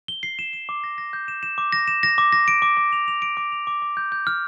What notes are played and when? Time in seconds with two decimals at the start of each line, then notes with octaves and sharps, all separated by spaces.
0.08 G7
0.23 C7
0.39 E7
0.53 E7
0.69 D6
0.84 A#6
0.98 A#6
1.13 G6
1.28 E7
1.43 E7
1.58 D6
1.73 A#6
1.88 E7
2.03 A#6
2.18 D6
2.32 A#6
2.48 D7
2.62 D6
2.77 D6
2.93 F7
3.08 F7
3.22 D7
3.37 D6
3.52 F7
3.67 D6
3.82 D6
3.97 G6
4.12 G6
4.27 F6